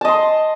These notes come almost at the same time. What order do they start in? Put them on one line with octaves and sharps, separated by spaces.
A5 D#5 C6